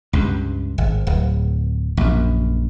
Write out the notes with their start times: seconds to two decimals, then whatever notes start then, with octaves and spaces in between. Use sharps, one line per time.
0.13 C#2 G2
0.78 G#1
1.07 D1
1.97 A#1 F#2